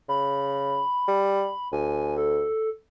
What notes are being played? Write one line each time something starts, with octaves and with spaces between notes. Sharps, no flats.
C#3 B5
G3
D2 G#5
A4